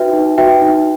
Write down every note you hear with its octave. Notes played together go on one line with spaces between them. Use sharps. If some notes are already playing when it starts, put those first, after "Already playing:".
Already playing: D#4 F#4 B4 E5 G5
D#4
F#4 B4 E5 G5
D#4